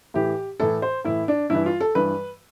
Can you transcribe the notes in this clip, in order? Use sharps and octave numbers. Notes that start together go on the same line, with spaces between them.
A2 E3 G4
A2 E3 A4
C5
A2 E3 E4
D4
G2 E3 E4
F4
A4
G2 E3 B4